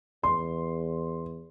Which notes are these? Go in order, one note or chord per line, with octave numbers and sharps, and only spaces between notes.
E2 C6